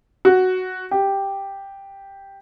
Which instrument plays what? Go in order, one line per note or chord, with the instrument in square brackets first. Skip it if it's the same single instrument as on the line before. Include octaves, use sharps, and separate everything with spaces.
[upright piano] F#4
G4